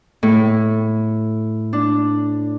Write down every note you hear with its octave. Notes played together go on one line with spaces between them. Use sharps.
A2
D4